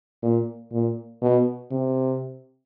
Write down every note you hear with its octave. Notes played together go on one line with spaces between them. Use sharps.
A#2
A#2
B2
C3